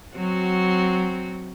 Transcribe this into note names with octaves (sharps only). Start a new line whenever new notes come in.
F#3 C4 F#4